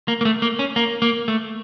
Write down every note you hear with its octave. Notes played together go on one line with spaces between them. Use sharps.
A#3
A#3
A3
A#3
C#4
A#3
A#3
A3